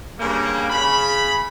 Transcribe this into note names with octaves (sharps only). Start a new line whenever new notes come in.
G2 C#3 G3 A#3
C#3 B5